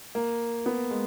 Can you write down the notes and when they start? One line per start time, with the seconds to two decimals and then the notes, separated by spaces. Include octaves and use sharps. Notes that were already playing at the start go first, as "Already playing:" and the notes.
0.15 A#3
0.66 B3
0.91 G#3